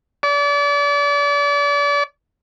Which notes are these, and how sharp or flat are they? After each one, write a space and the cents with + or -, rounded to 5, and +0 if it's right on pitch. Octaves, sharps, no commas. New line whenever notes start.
D5 -35